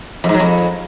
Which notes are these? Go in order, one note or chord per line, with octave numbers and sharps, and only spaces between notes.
F2
G#2
F#3
F2